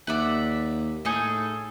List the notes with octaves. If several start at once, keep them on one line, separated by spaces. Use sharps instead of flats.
D#2 D5 E5 F#5
A2 D#4 G#4 A4